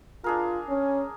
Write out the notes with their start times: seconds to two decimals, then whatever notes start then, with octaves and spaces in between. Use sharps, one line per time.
0.24 D4 F4 G#4 A#4
0.69 C#4